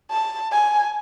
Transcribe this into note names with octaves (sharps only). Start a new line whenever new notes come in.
A5
G#5